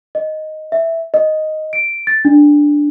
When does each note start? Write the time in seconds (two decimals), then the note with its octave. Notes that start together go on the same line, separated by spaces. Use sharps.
0.15 D#5
0.72 E5
1.14 D#5
1.73 D7
2.07 A6
2.25 D4